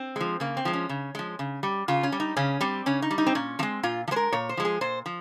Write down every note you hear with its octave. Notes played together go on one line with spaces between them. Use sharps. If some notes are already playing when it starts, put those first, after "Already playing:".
Already playing: C4
F3 G#3
C#3 A#3
C4
F3 G#3
C#4
C#3
F3 G#3
C#3
G3
C#3 F4
C#4
G3
D#4
C#3 C#4
G3 C4
C#3 C#4
D#4
G3
D#4
C4
A#2 C#4
F3 G#3 C4
A#2 F4
F3
G#3 C5
A#4
A#2 C#5
C5
F3 G#3
G#4
A#2 C5
F3